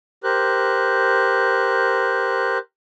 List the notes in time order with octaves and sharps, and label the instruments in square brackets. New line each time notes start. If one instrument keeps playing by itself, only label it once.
[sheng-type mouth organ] G4 A#4 C5 F#6